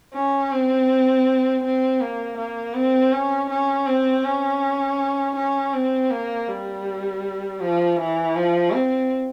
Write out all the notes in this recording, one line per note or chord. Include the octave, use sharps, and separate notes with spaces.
C#4
C4
C4
A#3
A#3
C4
C#4
C#4
C4
C#4
C#4
C4
A#3
G3
F3
E3
F3
C4